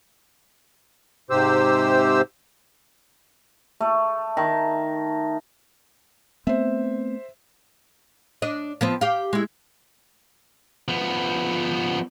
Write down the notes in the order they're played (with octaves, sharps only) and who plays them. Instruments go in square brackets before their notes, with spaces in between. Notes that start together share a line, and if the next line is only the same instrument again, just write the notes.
[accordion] G#2 C3 G4 C5 E6
[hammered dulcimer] A3
D#3
[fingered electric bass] A3 B3 C4 [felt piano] C5 E5
[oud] D4 D#5
F3 B3 C4
G4 F5
G#3 E4
[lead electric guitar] F3 B3